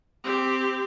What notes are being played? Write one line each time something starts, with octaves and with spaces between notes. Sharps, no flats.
C4 G4